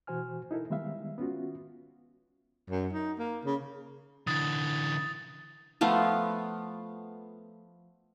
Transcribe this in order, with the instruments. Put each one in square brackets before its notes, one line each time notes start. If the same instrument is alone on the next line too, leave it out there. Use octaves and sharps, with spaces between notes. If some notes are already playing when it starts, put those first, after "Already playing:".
[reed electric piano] B2 E3 F#4 C5 G#5 F6
D#4 E4 A4 A#4
D#3 G3 G#3 B3 E5 F5
B3 C#4 F4 F#4
[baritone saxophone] F#2
D#4
A#3
C#3
[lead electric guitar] D3 E3 [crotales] D#6 A6
[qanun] F3 A3 B3 F4